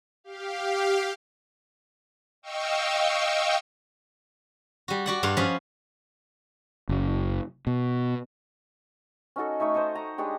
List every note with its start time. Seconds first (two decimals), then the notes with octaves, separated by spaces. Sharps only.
0.24 G4 F5
2.42 D#5 F5 G5 C#6 E6
4.88 G3 F#4
5.06 F#4 D5 F#5
5.23 G2 D4 F5 C6
5.37 F3 C#4 D#5 F5 B5
6.89 F#1
7.67 B2
9.36 C#4 D#4 F#4 A4
9.60 A3 D#4 C#5 E5
9.74 C5 D#5 A5 C#6
9.95 A#5
10.18 G#3 D4 G4 C#5